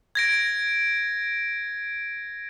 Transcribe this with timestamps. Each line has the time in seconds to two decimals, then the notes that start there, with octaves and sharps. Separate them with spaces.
0.15 G#6 A#6 D7